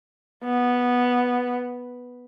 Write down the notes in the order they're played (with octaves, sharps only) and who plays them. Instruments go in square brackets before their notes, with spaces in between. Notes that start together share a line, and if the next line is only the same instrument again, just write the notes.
[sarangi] B3